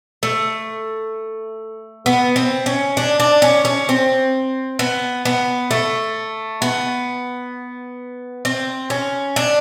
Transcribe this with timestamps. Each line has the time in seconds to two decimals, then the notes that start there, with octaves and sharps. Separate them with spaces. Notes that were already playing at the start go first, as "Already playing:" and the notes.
0.23 A3
2.06 B3
2.36 C4
2.66 C#4
2.97 D4
3.20 D4
3.42 C#4
3.65 C#4
3.89 C4
4.79 B3
5.25 B3
5.71 A3
6.62 B3
8.45 C4
8.90 C#4
9.36 D4